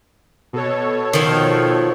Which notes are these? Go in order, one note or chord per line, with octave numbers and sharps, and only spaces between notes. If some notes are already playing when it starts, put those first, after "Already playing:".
B2 A4 C#5
D#3 F3